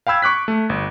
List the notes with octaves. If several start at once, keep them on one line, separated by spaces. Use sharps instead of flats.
F5 G5 B5 E6 G#6
C#6 D6 F#6 B6
A3
G1